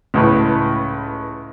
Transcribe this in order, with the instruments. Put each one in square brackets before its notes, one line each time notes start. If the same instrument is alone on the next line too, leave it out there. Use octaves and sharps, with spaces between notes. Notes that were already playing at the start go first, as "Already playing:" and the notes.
[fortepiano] C#2 A2 B4